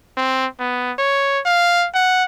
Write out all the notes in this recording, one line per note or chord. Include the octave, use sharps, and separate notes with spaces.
C4
B3
C#5
F5
F#5